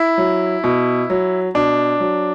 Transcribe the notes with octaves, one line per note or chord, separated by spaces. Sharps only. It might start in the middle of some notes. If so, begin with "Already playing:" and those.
Already playing: E4
F#3
B2
F#3
B2 D4
F#3